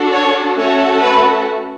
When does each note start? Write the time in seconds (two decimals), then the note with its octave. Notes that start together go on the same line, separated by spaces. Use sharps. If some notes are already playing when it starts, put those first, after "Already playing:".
Already playing: D4 F#4 A4
0.12 C#5
0.57 A3 C#4 F#4 A4 C#5
1.02 B4